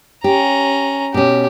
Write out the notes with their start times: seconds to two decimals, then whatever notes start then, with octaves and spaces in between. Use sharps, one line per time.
0.24 C#4 G4 A#5
1.14 B2 C#4 G4